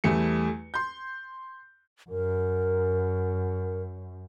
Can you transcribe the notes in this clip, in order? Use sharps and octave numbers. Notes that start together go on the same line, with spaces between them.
E2 G3 A3 C#7
C6 G6
F#2 A#4